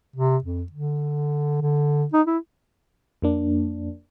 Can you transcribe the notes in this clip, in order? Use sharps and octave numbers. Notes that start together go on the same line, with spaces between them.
C3
F2
D3
D3
D#4
E4
F2 A#3 D4